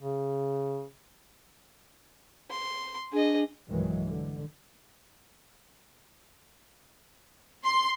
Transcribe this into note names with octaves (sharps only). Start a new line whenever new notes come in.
C#3
C6
D4 G#4 D#5
B1 G2 D#3 E3 F#3 G#3
D3
C6